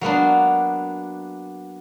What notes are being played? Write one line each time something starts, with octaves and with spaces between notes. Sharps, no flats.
F#3 A#3 B3 D4